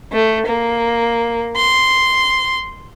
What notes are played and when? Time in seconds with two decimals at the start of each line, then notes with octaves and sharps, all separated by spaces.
0.13 A3
0.46 A#3
1.57 C6